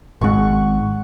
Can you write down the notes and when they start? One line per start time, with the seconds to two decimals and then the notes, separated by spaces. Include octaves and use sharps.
0.21 G#1 G#2 F#5 C#6